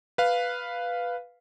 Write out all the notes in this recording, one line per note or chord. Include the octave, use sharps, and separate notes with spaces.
B4 F5